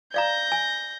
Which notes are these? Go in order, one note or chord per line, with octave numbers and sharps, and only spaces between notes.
D5 F5 A#5 G6 A#6
G#5